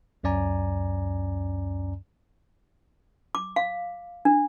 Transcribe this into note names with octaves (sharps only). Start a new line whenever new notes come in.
C#2 F#2 C#4 D5 G#5 A#5
D6
F5
D4